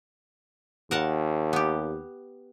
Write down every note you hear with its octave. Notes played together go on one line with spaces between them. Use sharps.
D#2 A#4 F#5 A5
B3 G4